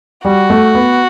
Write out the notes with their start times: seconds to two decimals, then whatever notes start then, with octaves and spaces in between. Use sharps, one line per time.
0.24 G3 F#4
0.50 A3
0.75 B3